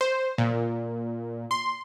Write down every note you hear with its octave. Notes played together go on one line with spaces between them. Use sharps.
C5
A#2
C6